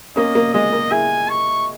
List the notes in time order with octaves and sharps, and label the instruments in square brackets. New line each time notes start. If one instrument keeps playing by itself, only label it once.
[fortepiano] A#3 C#4 [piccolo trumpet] D#5
[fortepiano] A#3
[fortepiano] G#3 [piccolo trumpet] D#5
[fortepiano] A#3
[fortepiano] E4 G#4 [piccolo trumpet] G#5
[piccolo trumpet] C#6